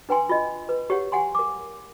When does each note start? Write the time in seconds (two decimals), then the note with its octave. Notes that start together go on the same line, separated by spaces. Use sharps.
0.09 D4 B4 G5 G#5 C6
0.29 F4 D#5
0.69 B4
0.90 G4 C#5 F#5
1.12 G4 F#5 G#5 C6
1.35 A#4 D6